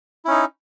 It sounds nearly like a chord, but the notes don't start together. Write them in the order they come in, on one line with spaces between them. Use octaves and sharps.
E4 C#4 D#4